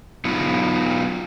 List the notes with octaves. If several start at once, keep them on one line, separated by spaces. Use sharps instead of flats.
F#3 B3 D#4 F4